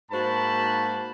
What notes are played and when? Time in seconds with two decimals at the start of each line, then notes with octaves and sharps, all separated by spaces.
0.11 G#2 A#3 F#4 C5 A5 B5